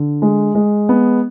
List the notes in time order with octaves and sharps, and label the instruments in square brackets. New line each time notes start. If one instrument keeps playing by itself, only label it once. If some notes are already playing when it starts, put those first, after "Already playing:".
Already playing: [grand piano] D3
G#3
G#3
B3